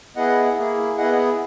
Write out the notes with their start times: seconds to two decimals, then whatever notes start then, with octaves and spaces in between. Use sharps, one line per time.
0.16 B3 E4 G#4 D#5 F#5
0.57 A#3 E4 G#4
0.97 B3 E4 G#4 D#5 F#5